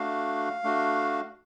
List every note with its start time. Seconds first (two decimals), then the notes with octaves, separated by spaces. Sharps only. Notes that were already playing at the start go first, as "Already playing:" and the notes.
Already playing: A3 D4 F#4 F5
0.64 A3 D4 F#4